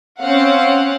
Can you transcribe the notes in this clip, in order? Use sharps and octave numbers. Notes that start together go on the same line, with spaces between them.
C4 C#4 F5 F#5